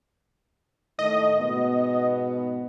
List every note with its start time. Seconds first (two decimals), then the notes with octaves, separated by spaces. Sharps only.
0.99 A2 D#3 A3 D#5
1.41 G#2 B2 B3